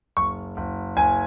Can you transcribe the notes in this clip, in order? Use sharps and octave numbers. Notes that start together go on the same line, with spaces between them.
F#1 C#6
F#1
F#1 G#5